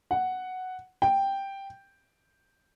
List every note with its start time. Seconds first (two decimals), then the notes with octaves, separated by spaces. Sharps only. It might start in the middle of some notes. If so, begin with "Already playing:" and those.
0.11 F#5
1.02 G5